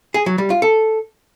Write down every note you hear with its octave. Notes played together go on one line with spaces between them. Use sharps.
G#4
F#3
G3
F4
A4